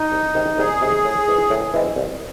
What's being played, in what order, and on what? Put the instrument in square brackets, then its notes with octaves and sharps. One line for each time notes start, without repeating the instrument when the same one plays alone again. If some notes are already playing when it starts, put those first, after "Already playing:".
Already playing: [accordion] D#4
[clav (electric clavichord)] C2
C3 D#3 G#3
[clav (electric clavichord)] C2 [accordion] G#4
[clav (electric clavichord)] C3 D#3 G#3
A2
E3 G#3 C4
A2
E3 G#3 C4
C2